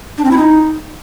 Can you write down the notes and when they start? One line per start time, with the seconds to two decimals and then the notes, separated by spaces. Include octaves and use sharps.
0.18 D4
0.24 C4
0.31 E4
0.38 D#4